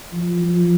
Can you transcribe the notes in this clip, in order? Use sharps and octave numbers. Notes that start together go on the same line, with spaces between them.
F3
F3